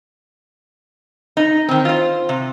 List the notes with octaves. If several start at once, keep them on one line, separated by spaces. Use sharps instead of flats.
D#4
D#3 C4
F4 C5
C3